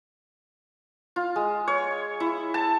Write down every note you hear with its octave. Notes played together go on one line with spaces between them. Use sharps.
F4
G#3
C#5
E4
A5